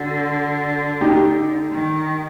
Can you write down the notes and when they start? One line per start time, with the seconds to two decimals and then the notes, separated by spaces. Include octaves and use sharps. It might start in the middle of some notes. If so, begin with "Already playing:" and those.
Already playing: D3 F#4
1.01 D#4 G4
1.72 D#3